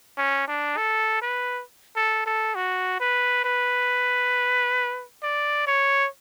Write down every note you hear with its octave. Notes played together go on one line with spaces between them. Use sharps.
C#4
D4
A4
B4
A4
A4
F#4
B4
B4
D5
C#5